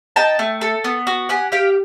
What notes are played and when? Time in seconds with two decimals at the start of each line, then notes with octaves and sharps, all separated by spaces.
0.16 D#4 G5 A5
0.39 A3
0.61 A4
0.84 B3
1.07 F#4
1.29 G4 F#5 G#5
1.52 G4 F5 G5